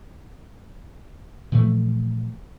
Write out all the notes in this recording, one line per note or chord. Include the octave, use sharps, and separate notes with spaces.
A#2 E3 F3 A3